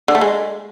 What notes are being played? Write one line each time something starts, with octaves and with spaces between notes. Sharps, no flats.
D3
A3
G#3